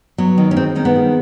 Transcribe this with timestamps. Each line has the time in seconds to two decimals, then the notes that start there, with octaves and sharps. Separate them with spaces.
0.18 F#3 B3
0.38 D#3
0.51 C#4
0.56 G#3 C4
0.75 D#3 C#4
0.85 B3
0.95 G#3